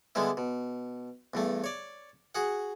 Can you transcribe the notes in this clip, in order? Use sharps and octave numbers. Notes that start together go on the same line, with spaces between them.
D3 G3 G#3 B3 E4
B2
E2 G2 A3
C#5 D5
F#4 G#4 F#5